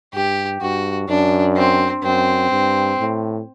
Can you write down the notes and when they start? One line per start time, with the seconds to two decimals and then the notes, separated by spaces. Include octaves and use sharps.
0.14 G2 G4
0.61 G2 F#4
1.09 F#2 D4
1.56 C4
2.03 F#2 C4
2.51 G2
2.99 A2